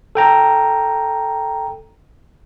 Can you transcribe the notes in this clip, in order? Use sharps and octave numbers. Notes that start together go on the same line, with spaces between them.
A4 G5 A#5